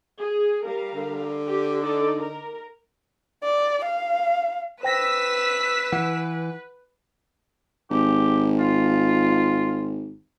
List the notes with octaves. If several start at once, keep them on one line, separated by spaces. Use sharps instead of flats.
G#4
G3 A#4 F5
D3
G4
D#4 A4 D5
A#4
D5
F5
B4 C5 G5 E6 A#6 B6
E3 F#5
G#1 G4
F4